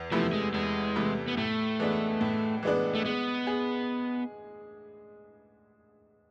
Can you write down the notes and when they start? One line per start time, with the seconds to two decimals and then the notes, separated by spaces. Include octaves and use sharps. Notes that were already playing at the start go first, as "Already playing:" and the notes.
Already playing: E2
0.12 C3 E3 F3 A3 E4
0.33 G#3
0.54 E2 G#3
0.96 C3 E3 A3 E4
1.28 B3
1.37 A2 A3
1.80 E3 G#3 B3 D4
2.21 A2
2.63 E3 G#3 B3 D4
2.95 A3
3.05 G#3 B3
3.47 G#4